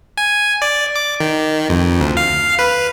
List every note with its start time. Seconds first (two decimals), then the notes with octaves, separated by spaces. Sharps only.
0.17 G#5
0.62 D5
0.96 D6
1.20 D#3
1.69 F2
2.01 D2
2.17 F5
2.59 B4